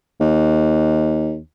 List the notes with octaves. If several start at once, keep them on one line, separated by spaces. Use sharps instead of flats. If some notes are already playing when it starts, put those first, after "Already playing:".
D#2